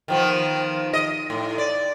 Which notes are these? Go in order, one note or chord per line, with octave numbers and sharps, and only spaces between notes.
D#3 F3 B3
D#5
A2
D5